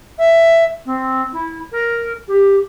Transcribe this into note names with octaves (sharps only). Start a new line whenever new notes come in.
E5
C4
E4
A#4
G4